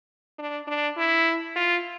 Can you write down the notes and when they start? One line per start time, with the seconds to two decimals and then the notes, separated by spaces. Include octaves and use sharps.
0.39 D4
0.67 D4
0.97 E4
1.56 F4